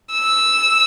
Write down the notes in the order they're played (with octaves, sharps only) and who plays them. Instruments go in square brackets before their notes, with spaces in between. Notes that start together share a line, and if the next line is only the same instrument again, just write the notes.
[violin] E6